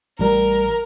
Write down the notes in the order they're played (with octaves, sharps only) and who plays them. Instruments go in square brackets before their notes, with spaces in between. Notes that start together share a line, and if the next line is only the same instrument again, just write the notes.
[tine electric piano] A1 G3 [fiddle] A#4